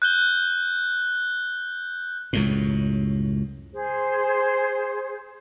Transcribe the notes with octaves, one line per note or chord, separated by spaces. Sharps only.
F#6 G6 G7
C#2 F#2 A2
G#4 C5